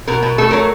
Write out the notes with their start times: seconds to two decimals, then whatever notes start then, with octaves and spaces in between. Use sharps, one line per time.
0.07 B2 A#4
0.23 B2
0.38 A3 A4
0.51 F#3 A#4